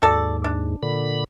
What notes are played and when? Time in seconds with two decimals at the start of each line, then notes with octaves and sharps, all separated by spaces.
0.02 D#2 G#2 F#4 A4 D5
0.44 D4
0.83 A#2 D3 B5